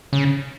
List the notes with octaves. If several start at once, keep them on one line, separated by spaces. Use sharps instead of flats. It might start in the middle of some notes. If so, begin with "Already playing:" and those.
C#3